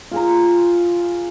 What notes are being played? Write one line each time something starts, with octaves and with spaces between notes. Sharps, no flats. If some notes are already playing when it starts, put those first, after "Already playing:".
F4 G#4 A#5